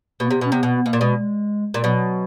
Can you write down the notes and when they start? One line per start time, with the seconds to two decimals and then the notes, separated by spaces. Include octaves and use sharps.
0.20 B2 A#3
0.28 B3
0.30 C3
0.41 B2 C#4
0.52 C3 B3
0.63 B2
0.77 B3
0.86 B2 A#3
0.93 A#2
1.01 B2 G#3
1.19 G#3
1.74 A#2
1.84 B2 F#3